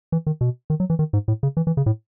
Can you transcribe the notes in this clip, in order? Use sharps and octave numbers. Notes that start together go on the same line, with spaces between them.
E3
D#3
B2
D#3
F#3
E3
D#3
G#2
A2
C#3
E3
E3
C#3
A2